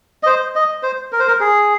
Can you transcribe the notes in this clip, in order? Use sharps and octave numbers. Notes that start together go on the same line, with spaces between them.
D#5
C5
D#5
C5
A#4
C5
A#4
G#4